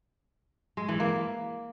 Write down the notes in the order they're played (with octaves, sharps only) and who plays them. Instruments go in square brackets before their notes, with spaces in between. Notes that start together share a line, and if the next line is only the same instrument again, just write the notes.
[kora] G#3
E3
A#3